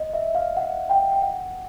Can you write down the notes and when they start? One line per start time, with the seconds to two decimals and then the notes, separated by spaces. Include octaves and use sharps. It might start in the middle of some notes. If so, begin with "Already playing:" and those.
Already playing: D#5
0.13 E5
0.35 F5
0.57 F#5
0.90 G5
1.12 G5
1.22 F#5